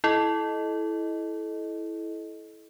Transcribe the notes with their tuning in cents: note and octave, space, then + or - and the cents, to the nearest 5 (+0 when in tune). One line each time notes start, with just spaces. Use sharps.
E4 +0 A4 -25 D#5 +0